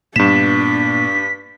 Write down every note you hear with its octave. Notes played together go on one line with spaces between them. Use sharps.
G2 A#2 B3 D4 B6 E7